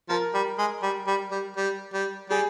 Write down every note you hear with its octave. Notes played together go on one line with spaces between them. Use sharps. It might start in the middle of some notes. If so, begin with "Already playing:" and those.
F3 A#4
G3
G#3
G3
G3
G3
G3
G3
G3 G#4